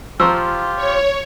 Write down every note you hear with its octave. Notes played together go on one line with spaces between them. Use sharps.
F3 F4 G4 A#5 C#6 E6
C#5